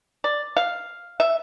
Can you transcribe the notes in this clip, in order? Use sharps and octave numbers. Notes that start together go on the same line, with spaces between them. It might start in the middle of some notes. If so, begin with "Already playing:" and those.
D5
F5
E5